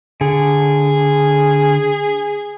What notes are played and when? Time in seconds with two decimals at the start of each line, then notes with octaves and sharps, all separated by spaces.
0.21 D3 G#4